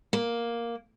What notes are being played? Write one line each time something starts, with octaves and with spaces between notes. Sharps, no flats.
A#3